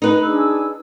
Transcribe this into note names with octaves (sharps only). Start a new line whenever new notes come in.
D#4 B4
D4 G#4 E6